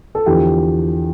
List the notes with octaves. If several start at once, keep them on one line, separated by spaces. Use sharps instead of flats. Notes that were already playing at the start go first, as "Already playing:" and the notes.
A4
E2 D3 F3 G4